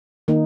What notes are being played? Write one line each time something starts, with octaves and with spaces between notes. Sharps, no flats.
D#3 A#3 D#4